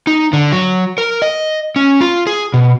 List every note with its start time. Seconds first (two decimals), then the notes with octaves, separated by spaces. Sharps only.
0.07 D#4
0.33 D3
0.52 F#3
0.98 A#4
1.22 D#5
1.76 C#4
2.01 F4
2.27 G#4
2.54 B2